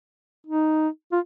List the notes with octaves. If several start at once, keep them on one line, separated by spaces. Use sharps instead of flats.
D#4
F4